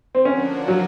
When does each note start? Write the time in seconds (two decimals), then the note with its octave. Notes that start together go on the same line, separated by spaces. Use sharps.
0.15 C4
0.25 D3 F3 A#3 C#4 D4 F#4
0.68 F#3